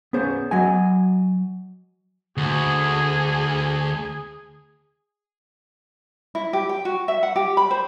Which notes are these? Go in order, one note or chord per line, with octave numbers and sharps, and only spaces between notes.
B3 C#4 G#4 C5
F#3 D#5 G#5
D2 G#4
E4
G4
G5
F#4
E5
F#5
G4
B5
C5